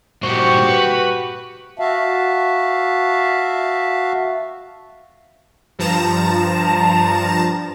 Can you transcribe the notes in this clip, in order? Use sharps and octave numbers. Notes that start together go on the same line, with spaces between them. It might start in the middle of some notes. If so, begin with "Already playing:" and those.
G2 A#2 F#4 G4 C5 C#6
B4
F#4 E5 F5 A5
G2 F3 A5 A#5 E7